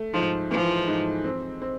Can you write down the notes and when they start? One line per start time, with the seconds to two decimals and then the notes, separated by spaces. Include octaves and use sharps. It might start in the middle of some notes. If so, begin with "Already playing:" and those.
Already playing: A3
0.13 G#2 F3
0.51 E3 F3
0.88 G#2
1.24 C4
1.62 C4